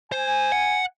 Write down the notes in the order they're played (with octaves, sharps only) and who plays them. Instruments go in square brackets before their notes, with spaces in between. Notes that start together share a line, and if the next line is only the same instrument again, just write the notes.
[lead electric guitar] C5 [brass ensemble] G#5
[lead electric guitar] F#5